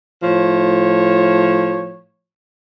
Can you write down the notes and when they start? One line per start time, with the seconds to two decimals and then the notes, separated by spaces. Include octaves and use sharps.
0.23 A2 F3 C#5